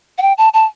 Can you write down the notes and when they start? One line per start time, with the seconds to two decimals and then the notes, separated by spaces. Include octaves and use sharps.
0.18 F#5
0.22 G5
0.38 A5
0.54 A5